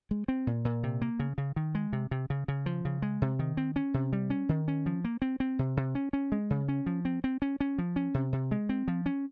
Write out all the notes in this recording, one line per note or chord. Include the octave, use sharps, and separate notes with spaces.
G#3
C4
A#2
A#2
C3
A#3
C#3
C#3
D#3
G#3
C3
C3
C#3
C#3
F3
C#3
G#3
C3
D#3
C4
C#4
C3
G3
C#4
D#3
C#4
F3
A#3
C4
C4
C3
C3
C#4
C#4
G#3
C#3
C#4
F3
C4
C4
C#4
C#4
F3
C#4
C3
C3
G#3
C4
F3
C#4